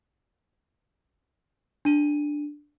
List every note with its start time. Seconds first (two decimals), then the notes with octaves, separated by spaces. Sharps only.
1.85 D4 D#7